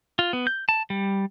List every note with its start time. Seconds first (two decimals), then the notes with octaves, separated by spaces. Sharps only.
0.19 F4
0.33 B3
0.47 G6
0.69 A5
0.90 G3